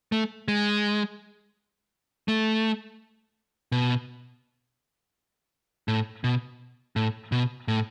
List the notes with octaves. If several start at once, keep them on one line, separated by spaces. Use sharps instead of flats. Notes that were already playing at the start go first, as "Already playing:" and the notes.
A3
G#3
A3
B2
A2
B2
A2
B2
A2